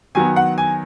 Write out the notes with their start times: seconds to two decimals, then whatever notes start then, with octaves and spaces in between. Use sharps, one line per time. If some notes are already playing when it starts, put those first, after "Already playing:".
0.15 D#3 F#3 B3 G#5
0.36 F#5
0.58 G#5